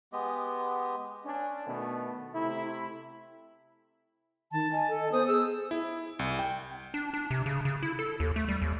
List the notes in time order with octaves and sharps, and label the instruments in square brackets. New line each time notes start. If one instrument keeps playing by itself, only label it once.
[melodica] G#3 B3 G4 D#5
[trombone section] C#4 D4
B2 D#3 A3 B3
C3 A3 E4
[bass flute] D#3 [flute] A5
[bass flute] D#5 [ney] G#5
[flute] A4
[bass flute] B3 [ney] C5 [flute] D#6
[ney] G#4 [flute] E6
[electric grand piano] E4
C2
G5
[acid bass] D4
D4
C3
C#3
C#3
E4
A4
D#2
A3
G3
D#2